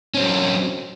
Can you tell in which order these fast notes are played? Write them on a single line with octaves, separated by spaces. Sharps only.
C#4 C4 F#3